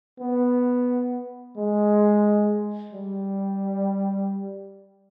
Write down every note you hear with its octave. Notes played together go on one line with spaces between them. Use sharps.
B3
G#3
G3